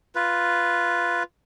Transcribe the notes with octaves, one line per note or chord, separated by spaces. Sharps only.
F4 B4